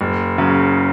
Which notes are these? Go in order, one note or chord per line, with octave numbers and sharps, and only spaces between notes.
F#1
C#3 F#3